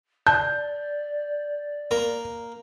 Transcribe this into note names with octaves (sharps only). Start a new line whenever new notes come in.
D5 A5 G6
A#3 A#5